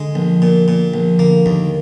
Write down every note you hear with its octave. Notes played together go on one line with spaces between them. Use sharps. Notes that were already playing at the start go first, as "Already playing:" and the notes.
Already playing: D3 G#3
A#1
A#2
A#2
A#1
D3 A#3
D#2 D#3